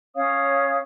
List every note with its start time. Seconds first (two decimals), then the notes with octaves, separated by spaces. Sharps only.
0.15 C#4 C#5 F5 D#6